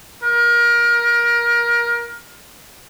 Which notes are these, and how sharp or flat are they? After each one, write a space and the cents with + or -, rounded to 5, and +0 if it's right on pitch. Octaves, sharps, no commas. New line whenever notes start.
A#4 +25